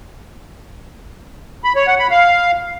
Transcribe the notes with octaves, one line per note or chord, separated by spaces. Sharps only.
B5
C#5
F#5
B5
F5